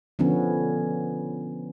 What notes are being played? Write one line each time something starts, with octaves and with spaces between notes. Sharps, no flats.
D3 F3 B3 C#4